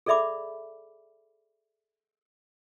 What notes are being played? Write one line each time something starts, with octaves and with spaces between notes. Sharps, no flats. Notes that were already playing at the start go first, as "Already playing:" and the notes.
G#4 A4 D5 E5 B5 D6